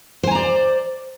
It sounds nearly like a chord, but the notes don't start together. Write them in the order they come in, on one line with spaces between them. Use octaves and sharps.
C5 G#5 A#5 D5